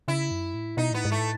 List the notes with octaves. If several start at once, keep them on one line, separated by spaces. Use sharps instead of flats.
C#3 E4
F#2
A2
B2 D#4
A2 B3
G#2
A3
A2